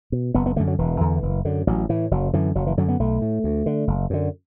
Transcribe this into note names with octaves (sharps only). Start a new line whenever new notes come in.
B2
F#1 B3
B3
F#2 D3 A3
F#3
E1 E3
E2 D3
F#1
F#2 D3
A1 F#3
A2 E3
F#1 F#3
F#2 D3 E3
F#1 F#3
E3
F#2 D3 F#3
B3
B1 A3
A2
D2
D3
F#1
F#2 D3